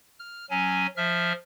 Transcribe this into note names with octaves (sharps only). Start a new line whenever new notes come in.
F6
F#3 C#4 G#5
F3 E5 F6